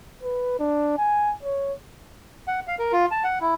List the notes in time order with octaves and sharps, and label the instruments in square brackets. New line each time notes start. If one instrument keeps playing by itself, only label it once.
[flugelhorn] B4
D4
G#5
C#5
[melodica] F#5
F5
A#4
F4
A5
F#5
E4